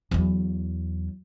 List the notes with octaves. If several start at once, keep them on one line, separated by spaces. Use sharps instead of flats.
E2 F#3